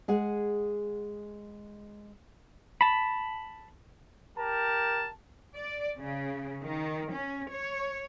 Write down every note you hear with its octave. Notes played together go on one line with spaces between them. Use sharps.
G#3 G#4 F#5
A5 B5
G4 A#4 A5
D5
C#3
D#3
C#4
C#5